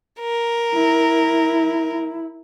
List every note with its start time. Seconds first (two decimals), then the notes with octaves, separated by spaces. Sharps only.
0.20 A#4
0.75 E4